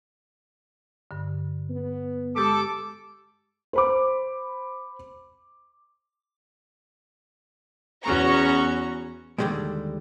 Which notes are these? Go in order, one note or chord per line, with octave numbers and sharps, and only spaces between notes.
G2 D3
B3
G#3 G4 A4 D6 D#6
C5 B5 D6
E2 B3 C#4 F#4 A#5 C#6
D#2 D3 F3 G3 G#3